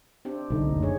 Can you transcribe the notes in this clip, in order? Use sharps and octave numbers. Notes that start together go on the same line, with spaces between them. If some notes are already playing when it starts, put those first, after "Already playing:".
C4 D4 G4
C2 D3 D#4
F#1 D2
D4 G#4 C#5